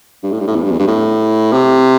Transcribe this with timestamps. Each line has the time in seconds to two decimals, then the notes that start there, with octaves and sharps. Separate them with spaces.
0.23 G2
0.32 A2
0.40 G2
0.47 A2
0.56 E2
0.63 G2
0.72 E2
0.79 G2
0.88 A2
1.52 C3